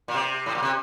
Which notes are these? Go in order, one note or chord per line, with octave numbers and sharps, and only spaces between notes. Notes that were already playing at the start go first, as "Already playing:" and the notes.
A#2
C3
A2
A#2
C3